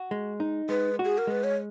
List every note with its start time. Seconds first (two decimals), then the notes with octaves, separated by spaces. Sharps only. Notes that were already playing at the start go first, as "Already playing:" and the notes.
Already playing: F#4
0.11 G#3
0.40 D#4
0.69 G#3 B4
0.99 F#4
1.05 G#4
1.18 A#4
1.27 G#3 B4
1.44 C#5